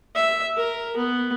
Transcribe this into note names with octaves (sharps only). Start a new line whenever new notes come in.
E5
A#4
B3